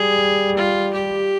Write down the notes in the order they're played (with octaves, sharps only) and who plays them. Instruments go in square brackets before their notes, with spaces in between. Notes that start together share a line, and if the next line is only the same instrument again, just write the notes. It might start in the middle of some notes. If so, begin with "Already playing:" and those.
Already playing: [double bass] G3 [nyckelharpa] G#4
[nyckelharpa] F4
G4